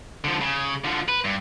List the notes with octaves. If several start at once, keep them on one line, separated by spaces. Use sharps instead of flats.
D3 F3
C#3
D3 F3
B4
G2